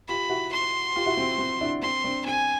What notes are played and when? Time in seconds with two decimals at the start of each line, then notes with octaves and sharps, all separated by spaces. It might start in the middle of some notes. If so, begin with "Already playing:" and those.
0.08 F4 G4 B5
0.30 E4 F#4
0.52 C6
0.96 F4 G4
1.06 E4 F#4
1.17 C4
1.38 C4
1.61 D4 E4
1.82 C4 C6
2.04 C4 D4
2.25 C4 G#5